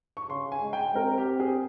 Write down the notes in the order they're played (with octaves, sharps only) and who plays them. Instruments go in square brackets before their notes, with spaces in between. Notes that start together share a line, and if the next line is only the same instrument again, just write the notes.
[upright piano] C#6
[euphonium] C#3 [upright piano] C6
[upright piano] G#5
[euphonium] G#3
[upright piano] G5
[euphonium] C4 [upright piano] A#4
[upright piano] G4
G#4